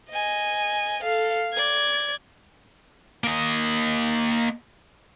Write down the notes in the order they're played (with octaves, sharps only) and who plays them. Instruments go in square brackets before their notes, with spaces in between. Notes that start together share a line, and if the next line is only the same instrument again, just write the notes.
[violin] D#5 G#5
A4 F5
D5 G#6
[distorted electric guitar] A#3 D#5